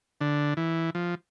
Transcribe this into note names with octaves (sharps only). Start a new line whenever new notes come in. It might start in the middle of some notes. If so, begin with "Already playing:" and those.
D3
E3
F3